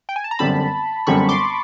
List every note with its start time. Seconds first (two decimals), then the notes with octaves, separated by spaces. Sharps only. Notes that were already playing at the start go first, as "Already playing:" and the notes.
0.09 G5
0.16 G#5
0.24 A5
0.31 A#5
0.39 G1 F#2 D3 G3 C4 A5 B5
1.07 G1 F#2 D3 G3 C4 B5 C#6
1.29 C6 D6